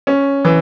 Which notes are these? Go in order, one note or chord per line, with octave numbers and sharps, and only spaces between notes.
C#4
E3